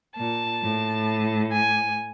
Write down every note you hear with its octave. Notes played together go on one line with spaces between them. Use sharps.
A#2 A5
A2
G#5